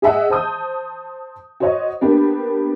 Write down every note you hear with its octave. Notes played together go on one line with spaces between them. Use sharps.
G#4 D#5 E5 F#5
C5 A5 D#6 G6
F#4 C5 C#5 D#5
A#3 B3 D4 G4 B4